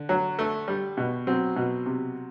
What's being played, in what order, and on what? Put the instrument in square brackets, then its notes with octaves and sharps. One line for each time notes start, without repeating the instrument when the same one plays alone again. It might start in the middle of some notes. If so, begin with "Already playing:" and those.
Already playing: [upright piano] D3
[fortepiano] F#3
A3
G3
B2
[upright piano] F#3 [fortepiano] C4
[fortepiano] B2
C3